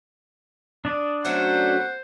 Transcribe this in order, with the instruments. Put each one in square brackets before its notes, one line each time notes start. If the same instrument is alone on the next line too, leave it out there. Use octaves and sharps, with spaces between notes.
[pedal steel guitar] D4 D5 [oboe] D#6
[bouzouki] F#3 A3 C#4 [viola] C5 [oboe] F#5